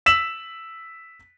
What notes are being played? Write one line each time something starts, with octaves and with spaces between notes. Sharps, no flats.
E6 B6 E7 F#7